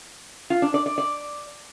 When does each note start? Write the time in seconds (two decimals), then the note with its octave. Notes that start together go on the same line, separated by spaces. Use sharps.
0.50 F4
0.62 D4
0.74 D5
0.86 D5
0.98 D5